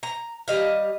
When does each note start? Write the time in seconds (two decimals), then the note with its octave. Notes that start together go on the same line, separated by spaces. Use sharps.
0.03 A#5
0.48 G3 D#5 F5